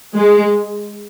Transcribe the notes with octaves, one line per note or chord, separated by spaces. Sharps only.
G#3